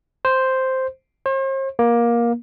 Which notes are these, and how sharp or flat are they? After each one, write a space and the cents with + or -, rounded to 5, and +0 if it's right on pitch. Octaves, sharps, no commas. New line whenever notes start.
C5 +0
C5 +45
A#3 +20